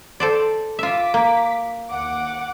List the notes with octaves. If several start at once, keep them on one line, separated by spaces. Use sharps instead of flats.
A4 C5 D5
F4 E5 D6 B6
A#3
D#2 F#5 D6